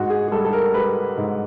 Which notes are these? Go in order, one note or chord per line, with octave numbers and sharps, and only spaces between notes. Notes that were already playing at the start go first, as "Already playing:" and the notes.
Already playing: G#2 F#4
G#4
G#4
G3 A4
A4
A#4
G3 B4
G#2